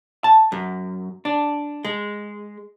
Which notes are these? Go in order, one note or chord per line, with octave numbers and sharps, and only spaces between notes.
A5
F#2
D4
G#3